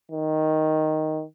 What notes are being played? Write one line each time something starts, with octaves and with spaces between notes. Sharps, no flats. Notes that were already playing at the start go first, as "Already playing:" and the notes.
D#3